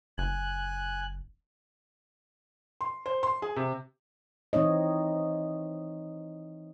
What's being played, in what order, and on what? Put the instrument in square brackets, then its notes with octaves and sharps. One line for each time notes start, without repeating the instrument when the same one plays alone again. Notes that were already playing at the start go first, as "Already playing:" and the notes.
[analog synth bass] F#1 [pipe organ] G#5 F#6
[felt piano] C6
C5
C6
G#4
C3
[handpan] E3 C4 D#4 C#5 D#5